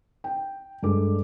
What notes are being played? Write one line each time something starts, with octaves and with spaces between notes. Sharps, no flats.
G5
G2 G#3 A4 D6